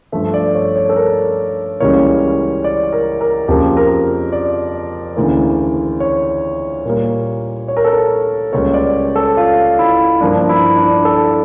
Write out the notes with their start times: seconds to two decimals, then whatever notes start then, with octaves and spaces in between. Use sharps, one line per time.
0.12 G2 F3 A3 E5
0.34 D5
0.55 C#5
0.76 C#5
0.89 A4
0.96 A#4
1.80 C#2 C#3 E3 G3 A#3 C#5
2.64 D5
2.92 A#4
3.21 A#4
3.48 F2 C#3 F3 A#3 G4
3.77 A#4
4.32 D5
5.16 D2 C#3 E3 A#3
6.00 C#5
6.85 A#2 G3 A#3
7.68 C#5
7.77 A#4
7.85 A4
7.92 A#4
8.52 C#2 C#3 G3 A#3 C#5
8.74 D5
9.16 A4
9.37 F4
9.79 E4
10.21 G2 F3 A#3 D4
10.49 E4
10.76 D4
11.05 A4